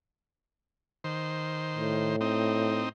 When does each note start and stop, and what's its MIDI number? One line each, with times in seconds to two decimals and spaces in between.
1.04 2.16 51
1.04 2.16 72
1.78 2.86 45
2.21 2.89 60
2.21 2.89 63